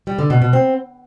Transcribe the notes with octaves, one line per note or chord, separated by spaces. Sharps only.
G3
D3
B2
B2
C4